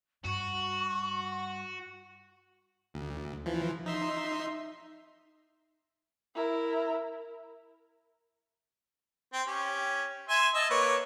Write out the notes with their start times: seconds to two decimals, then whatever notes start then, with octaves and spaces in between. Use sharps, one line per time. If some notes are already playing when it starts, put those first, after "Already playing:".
0.24 G2 F#4 C#6
2.94 D2
3.46 E3 F3
3.86 D#4 E5 C6
6.35 E4 A#4
9.33 C4
9.47 C#4 G4
10.29 E5 G#5 C6
10.54 D#5 A5 E6
10.70 A#3 B4 C#5